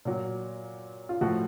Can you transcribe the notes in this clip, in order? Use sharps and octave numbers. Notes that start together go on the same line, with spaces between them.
A#2 F#3
F4
A2 F3 F#4